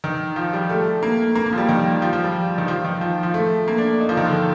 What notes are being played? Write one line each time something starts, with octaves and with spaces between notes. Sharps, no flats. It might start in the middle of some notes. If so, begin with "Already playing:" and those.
D#3
F3
G3
A3
A#3
A#3
A#3
F3
G3
D#3
F3
F3
G3
D#3
F3
D#3
F3
F3
A3
A#3
D4
D#4
F3
D#3
D3